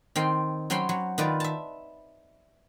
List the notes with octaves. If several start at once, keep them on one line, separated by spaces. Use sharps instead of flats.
D#3 C4 G5 C6
F#3 C#4 C5 G5 B5 C6
F#3
D#3 F4 B4 D5
E5 A5